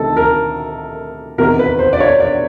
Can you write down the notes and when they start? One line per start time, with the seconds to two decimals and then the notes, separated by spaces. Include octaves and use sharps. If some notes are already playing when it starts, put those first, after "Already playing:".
Already playing: D2 C3 D#3 A4
0.17 A#4
1.38 E2 C3 D#3 A#4
1.59 B4
1.79 C5
1.93 D5
2.00 C#5
2.20 D5